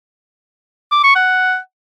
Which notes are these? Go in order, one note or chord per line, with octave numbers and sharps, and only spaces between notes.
D6
C#6
F#5